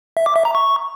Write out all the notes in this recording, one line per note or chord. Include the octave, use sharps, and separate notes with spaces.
E5
D6
E5
A#5
C#6